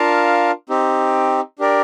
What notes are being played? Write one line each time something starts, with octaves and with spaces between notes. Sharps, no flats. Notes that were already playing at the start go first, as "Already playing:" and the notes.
Already playing: D4 F4 A#4 F5 A5
C4 D#4 G4
D4 G4 A#4 D5